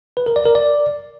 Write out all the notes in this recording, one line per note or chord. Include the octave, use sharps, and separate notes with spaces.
B4
A#4
D5
A#4
D5